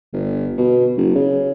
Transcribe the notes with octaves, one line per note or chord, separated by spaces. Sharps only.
G1
B2
F#1
C#3